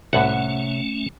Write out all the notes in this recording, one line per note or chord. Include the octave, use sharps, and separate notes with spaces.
C2 A2 C3 A3 C#4 C#5 E5 F#5